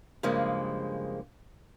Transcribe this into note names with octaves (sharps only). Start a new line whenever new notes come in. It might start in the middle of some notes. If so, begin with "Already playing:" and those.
G2 C#3 F3 G#3 A#3